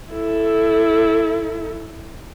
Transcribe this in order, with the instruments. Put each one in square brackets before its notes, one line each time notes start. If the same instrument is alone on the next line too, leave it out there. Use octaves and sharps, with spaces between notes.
[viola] E4 A4